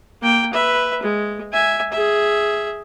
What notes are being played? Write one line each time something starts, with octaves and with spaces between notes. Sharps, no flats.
A#3 G5
B4 E5
G#3
E5 G#5
G#4 E5